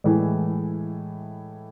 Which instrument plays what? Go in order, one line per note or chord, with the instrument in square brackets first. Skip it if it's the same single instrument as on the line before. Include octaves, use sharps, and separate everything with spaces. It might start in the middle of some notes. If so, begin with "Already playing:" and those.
[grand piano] A2 E3 G#3